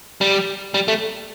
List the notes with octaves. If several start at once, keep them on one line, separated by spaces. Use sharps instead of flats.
G3
G3
A3